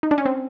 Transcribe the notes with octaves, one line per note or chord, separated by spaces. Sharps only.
D#4
D4
C#4
C4